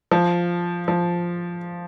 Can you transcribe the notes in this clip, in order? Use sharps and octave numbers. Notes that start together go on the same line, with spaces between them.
F3
F3